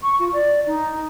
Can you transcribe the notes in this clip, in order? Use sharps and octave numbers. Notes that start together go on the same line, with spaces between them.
C#6
F4
D5
D#4